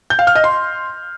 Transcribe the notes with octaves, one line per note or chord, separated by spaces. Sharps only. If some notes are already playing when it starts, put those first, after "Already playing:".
G6
F5
F6
D#5
C6